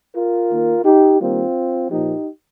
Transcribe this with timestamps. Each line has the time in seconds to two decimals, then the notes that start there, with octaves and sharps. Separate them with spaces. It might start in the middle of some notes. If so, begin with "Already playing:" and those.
0.14 F4 A#4
0.50 D#3 A#3
0.84 D#4 G4
1.19 D#3 G3 A#3 C4 F4
1.90 A#2 F3 A#3 D#4 G4